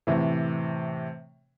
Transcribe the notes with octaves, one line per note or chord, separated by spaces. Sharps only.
A2 C3 E3